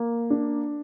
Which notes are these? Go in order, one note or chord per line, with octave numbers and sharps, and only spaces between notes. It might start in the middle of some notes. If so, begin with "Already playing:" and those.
Already playing: A#3
D4